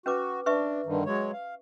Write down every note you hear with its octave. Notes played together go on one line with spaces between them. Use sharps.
C#4 F#4 B4 D6
D4 B4 E5 C#6
G2 D3 D#3
F#3 G#3 C#5
F5